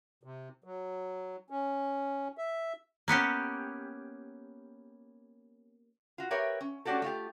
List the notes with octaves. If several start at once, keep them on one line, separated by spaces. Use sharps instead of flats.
C3
F#3
C#4
E5
A#3 B3 C#4 G4
F4 F#4
G4 A#4 B4 C#5 E5 G5
C#4
A3 C#4 D4 F#4 G4 A4
A3 F4 G4